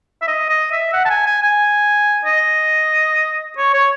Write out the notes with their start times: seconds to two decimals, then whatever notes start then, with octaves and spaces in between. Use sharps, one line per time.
0.22 E5
0.28 D#5
0.49 D#5
0.72 E5
0.93 F#5
1.05 A5
1.10 G#5
1.26 G#5
1.42 G#5
2.25 D#5
3.57 C#5
3.74 C#5